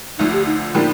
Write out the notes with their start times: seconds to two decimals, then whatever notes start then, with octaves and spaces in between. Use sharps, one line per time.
0.18 D2 D3 F3 A3 D#4
0.33 G4
0.46 D#4
0.74 A2 F3 A#3 D4 D#4 G4